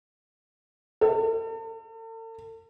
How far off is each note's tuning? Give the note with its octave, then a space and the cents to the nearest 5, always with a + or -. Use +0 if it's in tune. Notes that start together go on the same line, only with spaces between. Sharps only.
A4 +40